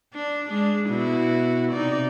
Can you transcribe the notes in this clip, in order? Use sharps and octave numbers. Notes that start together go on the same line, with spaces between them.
D4
G#3 D4
B2 E4 F#4
C3 D#4 D5